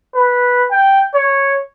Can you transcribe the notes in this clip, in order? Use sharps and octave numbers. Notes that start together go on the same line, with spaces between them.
B4
G5
C#5